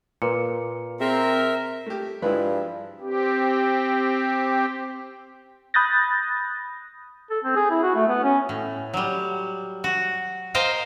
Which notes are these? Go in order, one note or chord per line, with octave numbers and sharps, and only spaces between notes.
A#2 A#4 B4 C#7
C4 G#4 A#4 E5
A3 G4
G2 F3 G#3 E4 B4
C4 G4
B5 D#6 F#6 G6 A6 A#6
A4
C4
G#4
E4
F#4
A3
B3
C#4
A2
F#3 G3
F#4
A#4 C5 D#5 F5 G5